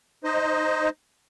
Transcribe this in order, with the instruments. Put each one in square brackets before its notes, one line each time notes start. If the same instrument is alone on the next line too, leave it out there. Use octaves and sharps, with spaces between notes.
[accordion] D#4 C5 D#5